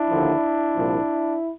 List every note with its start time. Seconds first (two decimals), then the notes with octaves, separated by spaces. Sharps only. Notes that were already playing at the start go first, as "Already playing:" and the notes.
Already playing: D4 E4
0.08 D#2 D3 F3
0.74 C2 A#2 F3